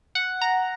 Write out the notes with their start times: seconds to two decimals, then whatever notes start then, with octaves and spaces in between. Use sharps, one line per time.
0.15 F#5
0.41 A#5